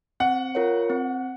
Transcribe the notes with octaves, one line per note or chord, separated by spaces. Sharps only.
C4 F#5
F4 A#4 C#5
C4